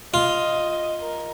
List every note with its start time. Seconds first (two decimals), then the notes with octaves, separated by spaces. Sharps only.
0.14 F4 D#5
1.01 A#4